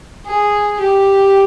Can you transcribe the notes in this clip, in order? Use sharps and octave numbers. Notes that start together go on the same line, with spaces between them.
G#4
G4